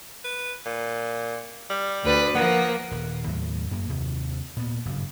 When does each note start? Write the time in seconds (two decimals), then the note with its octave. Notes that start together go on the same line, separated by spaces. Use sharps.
0.24 B4
0.66 A#2
1.70 G3
2.03 D2 B4 D5
2.35 F3 A#3 B3
2.91 D#1
3.27 D#2 A2 F#3
3.71 F#2 A#3
3.89 D#2 C3
4.57 A#2 B3
4.85 F#1 G2